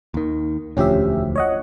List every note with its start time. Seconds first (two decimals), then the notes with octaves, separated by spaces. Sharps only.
0.14 D#2 D#3
0.77 E1 D2 F3 C#4 G4 E5
1.36 C#5 D#5 F#5